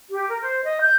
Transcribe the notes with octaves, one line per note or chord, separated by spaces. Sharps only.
G4
A#4
C5
D#5
G6